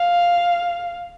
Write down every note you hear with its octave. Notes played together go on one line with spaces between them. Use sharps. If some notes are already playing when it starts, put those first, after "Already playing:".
Already playing: F5